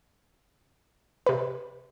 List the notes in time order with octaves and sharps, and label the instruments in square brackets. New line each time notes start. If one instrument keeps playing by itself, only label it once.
[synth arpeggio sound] C3 B4